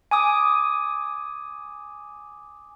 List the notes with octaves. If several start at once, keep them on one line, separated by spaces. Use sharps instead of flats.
G#5 D6 D#6